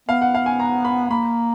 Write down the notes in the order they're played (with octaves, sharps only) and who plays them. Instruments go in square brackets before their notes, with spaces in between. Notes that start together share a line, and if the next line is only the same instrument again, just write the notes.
[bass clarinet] B3 [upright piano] F5
[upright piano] F#5
F5
G#5
A#5
B5
[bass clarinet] A#3 [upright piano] B5